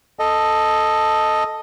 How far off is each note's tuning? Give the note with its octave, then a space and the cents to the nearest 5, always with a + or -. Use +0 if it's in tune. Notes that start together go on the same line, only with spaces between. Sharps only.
A4 +0 D#5 +0